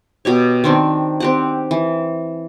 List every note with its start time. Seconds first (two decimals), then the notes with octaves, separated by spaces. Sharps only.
0.25 B2 G4 C#5
0.64 D#3 C4 D4
1.20 C4 G4 F#5
1.71 E3